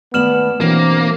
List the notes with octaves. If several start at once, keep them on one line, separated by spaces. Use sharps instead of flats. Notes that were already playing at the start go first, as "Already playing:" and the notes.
D#2 A3 B3 D5 F6 E7 F#7
B2 E3 F#3 A#3 C4 D4